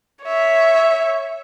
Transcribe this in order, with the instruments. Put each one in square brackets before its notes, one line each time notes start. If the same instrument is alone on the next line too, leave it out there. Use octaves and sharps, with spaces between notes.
[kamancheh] C#5 E5